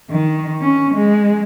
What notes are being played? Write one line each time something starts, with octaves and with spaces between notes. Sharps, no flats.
D#3
C#4
G#3